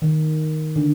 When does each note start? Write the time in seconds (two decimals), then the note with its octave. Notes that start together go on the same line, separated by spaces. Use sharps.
0.02 D#3
0.76 D3